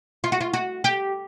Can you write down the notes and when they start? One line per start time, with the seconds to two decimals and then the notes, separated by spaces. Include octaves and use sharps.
0.24 F4
0.32 F#4
0.41 F4
0.53 F#4
0.84 G4